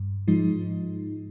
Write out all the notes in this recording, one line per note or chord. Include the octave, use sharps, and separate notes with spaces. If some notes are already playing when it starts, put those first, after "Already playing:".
Already playing: G2
G#2 F3 G#3 D#4